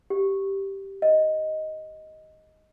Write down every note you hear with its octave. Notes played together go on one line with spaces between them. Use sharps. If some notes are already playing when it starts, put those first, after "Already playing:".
G4
D#5